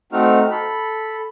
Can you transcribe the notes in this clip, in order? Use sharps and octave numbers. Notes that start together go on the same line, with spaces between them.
A3 C4 D#4 F#4 F6
A4 B5